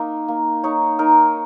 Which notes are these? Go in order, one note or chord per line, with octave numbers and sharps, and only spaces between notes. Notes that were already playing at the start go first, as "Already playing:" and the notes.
Already playing: A#3 D#4
A#3
D#4 C#5
D#4 A#4